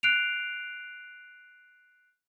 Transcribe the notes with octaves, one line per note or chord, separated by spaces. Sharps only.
F#6 C7 D7 F7